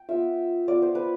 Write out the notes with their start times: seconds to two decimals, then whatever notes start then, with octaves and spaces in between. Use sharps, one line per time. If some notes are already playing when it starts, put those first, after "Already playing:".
Already playing: G5
0.09 B3 F4 E5
0.68 B3 F4 D5
0.82 C5
0.95 B4